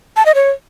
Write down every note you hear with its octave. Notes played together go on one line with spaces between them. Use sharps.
A5
D#5
C#5